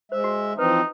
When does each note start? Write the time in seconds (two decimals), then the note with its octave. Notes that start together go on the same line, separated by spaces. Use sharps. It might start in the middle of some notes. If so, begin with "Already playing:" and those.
0.12 G#3 C5 E5
0.24 F#4 G#5
0.59 E3 F3 C4 D#4 B4